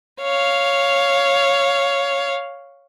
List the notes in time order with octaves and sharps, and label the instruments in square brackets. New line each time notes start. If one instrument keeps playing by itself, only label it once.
[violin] C#5 F5